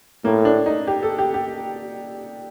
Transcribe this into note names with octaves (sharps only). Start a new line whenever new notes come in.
A2 A#3
D4
D#4
G4
A4
G4
G4